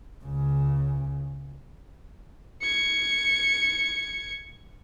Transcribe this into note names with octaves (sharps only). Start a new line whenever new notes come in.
C#2 C#3
G#6 C#7